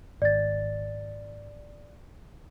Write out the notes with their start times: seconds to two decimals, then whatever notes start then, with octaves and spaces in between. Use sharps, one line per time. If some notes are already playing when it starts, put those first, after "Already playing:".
0.22 G#1 D5 A6